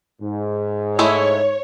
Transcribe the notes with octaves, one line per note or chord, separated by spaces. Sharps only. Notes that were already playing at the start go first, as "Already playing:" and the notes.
G#2
G#3 A3 E4 C#5